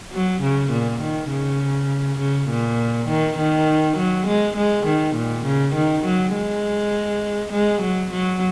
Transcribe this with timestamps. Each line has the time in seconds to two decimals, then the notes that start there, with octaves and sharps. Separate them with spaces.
0.13 F#3
0.42 C#3
0.71 A#2
1.02 D#3
1.31 C#3
2.20 C#3
2.49 A#2
3.08 D#3
3.38 D#3
3.97 F#3
4.27 G#3
4.57 G#3
4.86 D#3
5.16 A#2
5.45 C#3
5.75 D#3
6.05 F#3
6.34 G#3
7.52 G#3
7.82 F#3
8.11 F#3